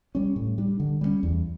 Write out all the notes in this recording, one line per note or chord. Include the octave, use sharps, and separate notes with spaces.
G3 C#4
A2
G3 D4
D3
G3 A#3 C#4
E2